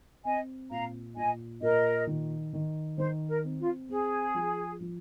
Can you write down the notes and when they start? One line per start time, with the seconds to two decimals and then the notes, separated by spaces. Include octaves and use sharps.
0.24 C4 D#5 G#5
0.70 A#2 F5 A#5
1.16 A#2 D#5 G#5
1.61 A#2 A#4 D#5
2.07 D#3
2.53 D#3
2.98 D#3 C5
3.28 A#4
3.44 C4
3.60 F4
3.89 C4 G#4
4.35 F3
4.80 F3